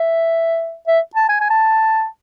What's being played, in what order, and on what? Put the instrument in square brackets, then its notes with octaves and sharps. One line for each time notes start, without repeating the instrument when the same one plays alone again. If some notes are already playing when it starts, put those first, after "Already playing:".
Already playing: [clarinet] E5
E5
A5
G#5
G#5
A5